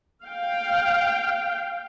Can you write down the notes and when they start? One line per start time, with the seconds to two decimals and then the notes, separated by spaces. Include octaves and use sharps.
0.25 F5 G5